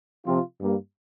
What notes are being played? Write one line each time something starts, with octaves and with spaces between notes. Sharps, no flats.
C3 F3 C4 F4
G2 G3 A#3